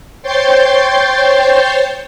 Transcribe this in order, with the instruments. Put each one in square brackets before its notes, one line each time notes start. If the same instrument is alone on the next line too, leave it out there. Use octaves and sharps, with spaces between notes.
[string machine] C5 C#5 G5 G6 A6 C7